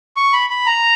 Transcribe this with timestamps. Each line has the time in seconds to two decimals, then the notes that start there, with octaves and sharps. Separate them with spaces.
0.17 C#6
0.33 B5
0.50 B5
0.67 A#5